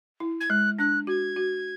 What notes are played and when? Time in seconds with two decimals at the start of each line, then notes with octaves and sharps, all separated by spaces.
0.20 E4
0.40 G#6
0.50 G#3 F#6
0.79 D4 F#6
1.07 F#4 G#6
1.36 F#4